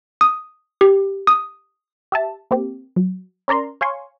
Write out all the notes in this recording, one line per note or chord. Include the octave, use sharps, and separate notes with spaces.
D#6
G4
D#6
G4 E5 A5
A#3 C4 G4
F#3
C#4 A#4 D5 A#5 C6
C#5 F5 G#5 C6 C#6